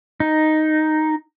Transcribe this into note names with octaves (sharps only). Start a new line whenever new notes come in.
D#4